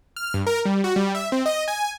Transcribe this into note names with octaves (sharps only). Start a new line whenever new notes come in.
F6
G2
A#4
G3
F#4
G3
E5
C4
D#5
G#5